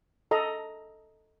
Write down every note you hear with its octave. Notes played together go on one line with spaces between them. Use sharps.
A4 D#5 A#5